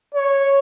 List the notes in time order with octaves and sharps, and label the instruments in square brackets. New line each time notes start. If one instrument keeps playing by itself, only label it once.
[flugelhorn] C#5